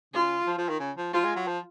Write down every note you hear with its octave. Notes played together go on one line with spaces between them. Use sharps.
C#3 F4
F3
F3
D#3
C#3
F3
F3 F4
G#3
F#3
F3